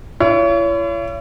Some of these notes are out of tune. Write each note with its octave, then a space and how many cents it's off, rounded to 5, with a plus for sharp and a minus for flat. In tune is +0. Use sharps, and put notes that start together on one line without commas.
E4 +45 C#5 +30